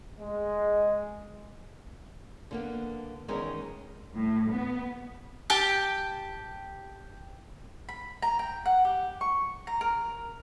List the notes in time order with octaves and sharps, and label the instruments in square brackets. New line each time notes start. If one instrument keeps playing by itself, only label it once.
[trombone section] G#3
[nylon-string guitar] D3 A#3 B3
E2 D#3 G#3 C#4 A#4
[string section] A2
B3
[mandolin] G4 G5 A5
[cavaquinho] B5
A#5
G5
F#5
G4
C#6
A#5
A#4